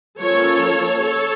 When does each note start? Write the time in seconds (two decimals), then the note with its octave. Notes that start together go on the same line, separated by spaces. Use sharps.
0.20 F3 A#3 C#4 A4 C#5
1.02 A4 C#5